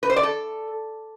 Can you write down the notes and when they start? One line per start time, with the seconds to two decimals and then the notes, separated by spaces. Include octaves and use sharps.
0.03 B4
0.10 C5
0.16 D5
0.23 A4